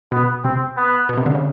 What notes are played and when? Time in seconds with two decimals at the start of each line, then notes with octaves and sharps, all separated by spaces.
0.12 B2 B3
0.44 C3 C4
0.77 B3
1.09 B2
1.17 C3
1.26 D3
1.35 C#3